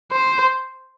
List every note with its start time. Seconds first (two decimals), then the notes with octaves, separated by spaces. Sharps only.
0.12 C5